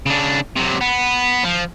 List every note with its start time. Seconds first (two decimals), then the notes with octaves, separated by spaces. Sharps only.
0.06 C#3 D4
0.56 C3 F#3
0.81 B3
1.44 F3